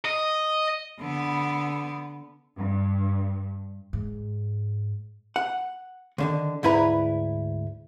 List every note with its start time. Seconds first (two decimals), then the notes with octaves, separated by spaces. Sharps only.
0.05 D#5
1.00 D3 B3
2.56 G2
3.93 G#2
5.36 F#5
6.18 C#2 D3 D#3
6.63 D2 G#2 E4 B4 A#5